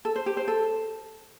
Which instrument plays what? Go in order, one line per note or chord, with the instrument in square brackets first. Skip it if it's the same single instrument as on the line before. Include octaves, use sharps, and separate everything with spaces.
[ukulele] A4
C5
G4
C5
A4